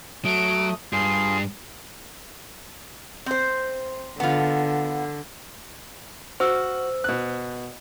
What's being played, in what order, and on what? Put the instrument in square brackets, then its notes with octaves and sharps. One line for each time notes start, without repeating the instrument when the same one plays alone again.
[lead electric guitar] F#3 [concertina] A3 D#6 [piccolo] D7
[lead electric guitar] G2 [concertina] F4 G#4 [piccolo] C7
[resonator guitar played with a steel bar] C4 C5
[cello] D3 [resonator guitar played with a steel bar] B3 F4
[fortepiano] F#4 [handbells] C5 E6
[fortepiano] B2 F#6